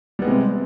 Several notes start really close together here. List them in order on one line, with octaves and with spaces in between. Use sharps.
G3 B3 G#3 C3 C4